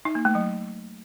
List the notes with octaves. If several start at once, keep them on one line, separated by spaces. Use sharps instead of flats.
D#4
A#3
A3
F#3